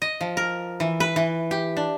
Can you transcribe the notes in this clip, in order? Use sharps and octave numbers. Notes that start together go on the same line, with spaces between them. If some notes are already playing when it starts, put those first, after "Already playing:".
D#5
F3
A#4
E3
B4
E3
G4
D4